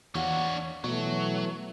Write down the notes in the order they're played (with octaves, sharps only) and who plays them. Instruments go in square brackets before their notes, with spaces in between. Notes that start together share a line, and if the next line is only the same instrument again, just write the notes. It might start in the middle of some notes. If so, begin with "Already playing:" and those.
[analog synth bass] E2 [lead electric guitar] D4 C#5 [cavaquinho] F#4 F5 C#6
[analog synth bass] B2 [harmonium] E3 A3 [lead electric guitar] F#3